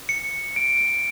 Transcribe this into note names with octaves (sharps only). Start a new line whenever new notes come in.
C#7
D7